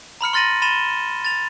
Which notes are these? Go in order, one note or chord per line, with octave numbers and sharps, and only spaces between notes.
A#5 B5 F6 C#7
C6 F6 A6 A#6 D#7 F#7
B5 A6 D#7 E7 G7
A6 F7